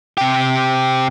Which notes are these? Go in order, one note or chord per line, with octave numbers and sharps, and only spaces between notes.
C3 G4